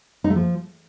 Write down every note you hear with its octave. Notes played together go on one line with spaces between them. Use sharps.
D#4
A3
F3